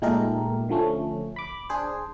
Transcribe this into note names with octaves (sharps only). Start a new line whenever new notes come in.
A#2 G#3 A3 D#4 G4 A#4
D3 F3 A3 C#4
B5 D6
D4 G#4 C5